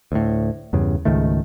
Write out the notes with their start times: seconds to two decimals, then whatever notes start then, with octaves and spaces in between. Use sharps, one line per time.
0.12 D2 A2
0.73 E2 G2 C#3
1.05 C#2 G#2 D#3 A3